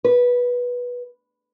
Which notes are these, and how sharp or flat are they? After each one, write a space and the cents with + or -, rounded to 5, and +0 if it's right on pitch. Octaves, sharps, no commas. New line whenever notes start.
B4 -15